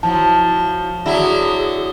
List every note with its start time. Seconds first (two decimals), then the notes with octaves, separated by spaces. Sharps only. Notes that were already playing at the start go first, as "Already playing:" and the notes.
0.03 F3 F#3 E4 A5
1.06 D3 F#3 E4 G#4